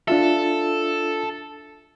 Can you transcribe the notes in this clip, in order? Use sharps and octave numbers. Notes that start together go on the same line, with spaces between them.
D4 F4 A4 E5